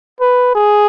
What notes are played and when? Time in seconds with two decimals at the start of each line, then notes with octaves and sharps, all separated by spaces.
0.20 B4
0.55 G#4